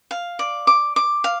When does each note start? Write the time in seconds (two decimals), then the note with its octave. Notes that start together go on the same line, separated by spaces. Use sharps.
0.11 F5
0.39 D5
0.67 D6
0.96 D6
1.24 F5